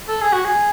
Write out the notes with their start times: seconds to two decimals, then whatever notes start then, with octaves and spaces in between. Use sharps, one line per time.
0.08 A4
0.21 G#4
0.32 F#4
0.45 G#4